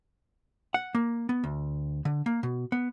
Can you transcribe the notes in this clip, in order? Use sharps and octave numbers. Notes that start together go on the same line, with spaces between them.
F#5
A#3
B3
D2
D3
A#3
B2
B3